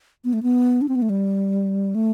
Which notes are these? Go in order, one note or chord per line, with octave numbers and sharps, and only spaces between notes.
B3
A3
B3
D4
C4
B3
A3
G3
A3